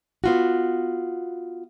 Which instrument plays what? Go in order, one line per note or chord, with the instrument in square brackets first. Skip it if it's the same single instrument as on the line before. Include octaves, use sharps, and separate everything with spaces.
[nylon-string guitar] B3 F4 F#4